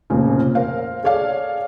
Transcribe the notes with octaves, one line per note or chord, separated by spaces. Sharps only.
F1 A#2 C#3
A#4 C5 F5
G#4 A4 C#5 D5 F5